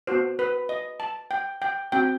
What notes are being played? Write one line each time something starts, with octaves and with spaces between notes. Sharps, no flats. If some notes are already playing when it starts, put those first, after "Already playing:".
B3 F#4 C5
B4
D#5
A5
G5
G5
C4 F#4 G5